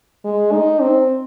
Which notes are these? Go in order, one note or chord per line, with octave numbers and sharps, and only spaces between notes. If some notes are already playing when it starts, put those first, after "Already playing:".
G#3
D#4
C4